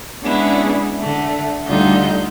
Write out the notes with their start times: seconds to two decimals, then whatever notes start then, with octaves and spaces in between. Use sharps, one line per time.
0.21 G#3 B3 C#4 D4 E4 G#4
0.99 D3 A3
1.66 D2 D3 G3 D#4 F4 G6